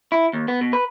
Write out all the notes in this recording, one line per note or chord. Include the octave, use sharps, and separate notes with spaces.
E4
D#2
B3
B2
B4